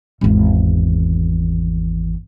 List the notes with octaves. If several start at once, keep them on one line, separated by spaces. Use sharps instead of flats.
G#1 E2